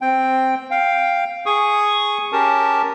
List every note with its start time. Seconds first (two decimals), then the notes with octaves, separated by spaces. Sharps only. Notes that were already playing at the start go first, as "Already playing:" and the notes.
0.01 C4 G5
0.71 F5 G5
1.46 G#4 C#6 D#6
2.33 C#4 G4 A#4 A5